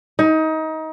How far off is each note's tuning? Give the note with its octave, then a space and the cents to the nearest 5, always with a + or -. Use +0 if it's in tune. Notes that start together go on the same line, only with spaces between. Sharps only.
D#4 +25